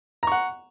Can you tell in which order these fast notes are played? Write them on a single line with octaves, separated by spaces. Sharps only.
A#5 C#6 F#5